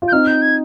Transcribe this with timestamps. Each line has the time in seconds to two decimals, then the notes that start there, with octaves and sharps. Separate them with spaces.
0.02 F4
0.08 G6
0.12 C4 D#4 F6
0.27 G6
0.42 G#6